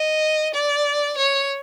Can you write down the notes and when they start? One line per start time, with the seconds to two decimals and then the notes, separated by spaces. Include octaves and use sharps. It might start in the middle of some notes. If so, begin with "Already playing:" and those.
Already playing: D#5
0.54 D5
1.18 C#5